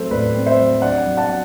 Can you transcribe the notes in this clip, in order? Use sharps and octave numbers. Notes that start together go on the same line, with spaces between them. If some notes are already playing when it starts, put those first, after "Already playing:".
Already playing: F#3 A3 C4 A4 C5
A2 B4 D5
C4
C5 E5
F#3
D4 D5 F#5
F#3
F#5 A5
B3